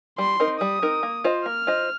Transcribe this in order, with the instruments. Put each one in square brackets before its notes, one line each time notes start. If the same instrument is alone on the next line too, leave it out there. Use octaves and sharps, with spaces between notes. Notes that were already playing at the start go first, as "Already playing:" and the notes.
[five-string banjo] G3 [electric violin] C6
[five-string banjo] C4 D#4 A#4
[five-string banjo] G3 [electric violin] D#6
[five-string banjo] C4 D#4 A#4
A#3
F4 C5 D#5
[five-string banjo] A#3 [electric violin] F6
[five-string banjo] F4 C5 D#5